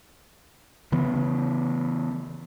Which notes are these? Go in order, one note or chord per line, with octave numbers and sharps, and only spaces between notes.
C#3 E3 B3